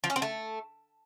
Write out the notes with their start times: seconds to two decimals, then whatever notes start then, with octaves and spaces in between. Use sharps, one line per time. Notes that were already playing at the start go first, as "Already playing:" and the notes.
0.04 F3
0.10 C#4
0.16 C4
0.22 A3